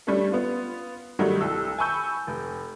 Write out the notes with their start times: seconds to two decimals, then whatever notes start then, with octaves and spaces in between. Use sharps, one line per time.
0.07 G3 A3 C#4 D4 A4
0.32 B3 F4
1.19 D#3 F#3 G3 A3 D#4
1.41 C2 A4 E6
1.79 G#5 A5 B5 C#6 E6 G6
2.27 F1